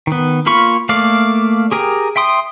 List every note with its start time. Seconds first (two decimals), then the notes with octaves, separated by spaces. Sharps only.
0.07 D#3 B3
0.46 A#3 F4 B5 C#6
0.89 A3 A#3 D5 F5
1.71 G4 G#4 A#4 G5 A#5
2.16 E5 G5 C6 D#6